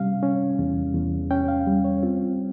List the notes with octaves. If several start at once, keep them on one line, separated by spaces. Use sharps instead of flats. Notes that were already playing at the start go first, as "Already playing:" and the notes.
Already playing: C3 G3 C#4 F5
C#4
E2
E2
C#4 G5
F5
G3
C#5
C4 F4